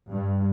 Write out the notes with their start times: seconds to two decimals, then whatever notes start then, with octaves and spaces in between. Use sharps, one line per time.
0.11 G2